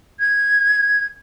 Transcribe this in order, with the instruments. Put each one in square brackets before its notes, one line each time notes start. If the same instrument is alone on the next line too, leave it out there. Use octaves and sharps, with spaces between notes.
[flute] G#6